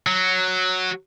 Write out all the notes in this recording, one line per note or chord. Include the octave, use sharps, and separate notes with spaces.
F#3